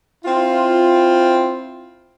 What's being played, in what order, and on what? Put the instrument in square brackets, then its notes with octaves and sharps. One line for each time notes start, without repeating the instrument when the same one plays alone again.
[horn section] C4 E4 F4